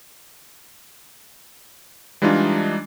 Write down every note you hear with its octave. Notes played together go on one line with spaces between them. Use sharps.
E3 G3 G#3 D4 D#4 F4